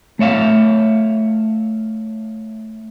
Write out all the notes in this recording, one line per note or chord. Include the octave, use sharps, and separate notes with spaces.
A3 C#5 E5 F5